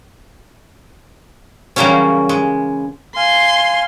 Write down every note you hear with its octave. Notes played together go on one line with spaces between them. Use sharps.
C#3 E3 F#3 G3 A#3 C#4
G#3
F5 G#5 C6